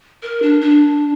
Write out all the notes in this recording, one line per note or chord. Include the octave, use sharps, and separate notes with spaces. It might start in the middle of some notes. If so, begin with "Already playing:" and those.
A#4
D4
D4